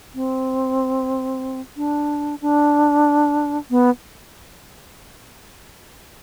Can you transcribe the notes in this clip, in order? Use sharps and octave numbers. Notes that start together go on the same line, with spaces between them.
C4
D4
D4
B3